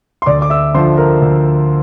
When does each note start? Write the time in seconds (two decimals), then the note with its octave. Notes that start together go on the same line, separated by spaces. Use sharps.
0.22 C6
0.26 D2 D5 D6
0.42 D6
0.50 E5 E6
0.75 D3 F3 C5 C6
0.97 A#4 A#5
1.22 D2